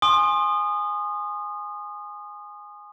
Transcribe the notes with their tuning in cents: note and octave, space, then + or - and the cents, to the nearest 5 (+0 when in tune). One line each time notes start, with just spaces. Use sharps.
G#5 +0 C6 +25 D#6 -25